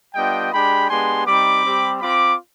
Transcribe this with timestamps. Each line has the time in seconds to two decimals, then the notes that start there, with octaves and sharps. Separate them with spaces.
0.15 G3 B3 D4 F4 D#5 G5
0.52 G#3 D4 G4 G5 B5
0.89 G#3 B3 D4 G4 G#5 C6
1.26 G3 C4 D#4 B5 D6
1.63 G3 C4 G4
2.00 C4 F4 B5 D6